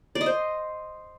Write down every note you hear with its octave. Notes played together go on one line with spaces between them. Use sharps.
D5
D#5
C5